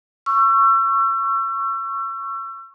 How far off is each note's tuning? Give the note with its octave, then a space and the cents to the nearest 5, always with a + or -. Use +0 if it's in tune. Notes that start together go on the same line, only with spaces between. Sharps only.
C#6 -5 E6 +35